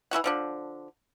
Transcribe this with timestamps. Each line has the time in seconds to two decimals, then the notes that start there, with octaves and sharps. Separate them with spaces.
0.11 E3 E4 F#4 F#5
0.24 D3 F3 D4